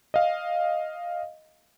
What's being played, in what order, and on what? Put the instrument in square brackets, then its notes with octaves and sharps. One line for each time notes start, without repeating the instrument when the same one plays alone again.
[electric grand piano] D#5 F5